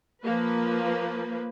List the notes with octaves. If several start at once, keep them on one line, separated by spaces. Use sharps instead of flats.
F3 A#3 B4